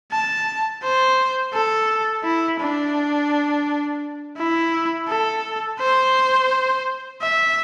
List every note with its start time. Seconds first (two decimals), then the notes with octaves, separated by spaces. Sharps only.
0.11 A5
0.82 C5
1.53 A4
2.24 E4
2.60 D4
4.37 E4
5.08 A4
5.80 C5
7.21 E5